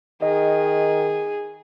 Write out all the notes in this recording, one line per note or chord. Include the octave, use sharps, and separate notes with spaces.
D#3 G#4 D#5